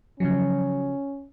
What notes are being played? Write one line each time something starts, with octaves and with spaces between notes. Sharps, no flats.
C#3 F3 F#3 C#4